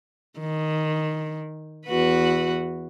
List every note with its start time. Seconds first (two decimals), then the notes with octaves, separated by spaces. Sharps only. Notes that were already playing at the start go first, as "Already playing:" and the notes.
0.39 D#3
1.87 E2 F#4 B4